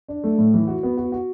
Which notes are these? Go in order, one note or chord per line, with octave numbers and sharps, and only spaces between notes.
D4
A3
A2
E3
F#4
B3
F#4
F#4